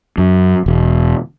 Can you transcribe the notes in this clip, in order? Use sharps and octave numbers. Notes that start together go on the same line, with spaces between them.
F#2
E1